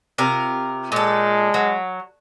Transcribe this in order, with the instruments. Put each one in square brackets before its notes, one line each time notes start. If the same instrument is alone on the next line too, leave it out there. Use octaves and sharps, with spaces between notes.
[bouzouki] C3 F4 A#4
[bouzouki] A#2 A4 [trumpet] G#3
[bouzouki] F#3